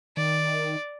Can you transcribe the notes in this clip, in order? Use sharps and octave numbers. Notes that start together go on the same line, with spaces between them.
D#3 D5